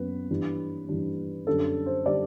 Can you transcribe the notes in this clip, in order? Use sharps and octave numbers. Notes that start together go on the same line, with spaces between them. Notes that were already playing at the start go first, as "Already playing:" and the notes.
Already playing: F#2 F#3 B3 B4
G2 E3 G3 D4
G2 E3 G3 D4
F#2 D3 G3 D4 A4
C5
D3 G3 D4 D5